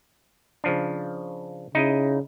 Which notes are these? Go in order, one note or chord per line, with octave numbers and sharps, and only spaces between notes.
C#3 F3 D4
C#3 D#4 E4 D#5